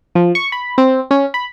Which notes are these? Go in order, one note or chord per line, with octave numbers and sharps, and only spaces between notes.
F3
C#6
B5
C4
C#4
B5